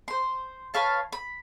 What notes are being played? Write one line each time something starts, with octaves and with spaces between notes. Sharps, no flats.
C5 C6
B4 C#5 F5 A5
B5